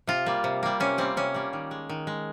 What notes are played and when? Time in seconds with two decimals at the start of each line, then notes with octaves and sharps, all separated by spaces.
0.07 C3 F4
0.26 G3 A#3
0.44 C3
0.63 G3 A#3
0.80 C3 C#4
0.98 G3 A#3 C4
1.17 C3 C#4
1.34 G3 A#3
1.53 D#3
1.71 G#3
1.89 D#3
2.07 G#3